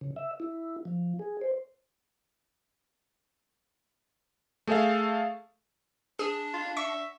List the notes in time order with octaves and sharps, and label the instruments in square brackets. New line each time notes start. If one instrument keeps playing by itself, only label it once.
[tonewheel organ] C#3
E5
E4
F3
G#4
C5
[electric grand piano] A3 G#4 A4 E5 F5
[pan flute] D4 [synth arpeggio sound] G#4
[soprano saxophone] F4
[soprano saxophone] E5 [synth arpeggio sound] C#6 C#7